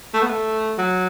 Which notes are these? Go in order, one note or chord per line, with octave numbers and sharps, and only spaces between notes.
A3
B3
A3
F#3